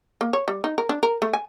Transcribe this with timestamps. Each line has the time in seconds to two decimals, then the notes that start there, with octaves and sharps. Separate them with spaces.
0.21 A#3
0.33 C#5
0.48 G3
0.64 D#4
0.78 A#4
0.89 D4
1.03 A#4
1.22 A3
1.33 G#5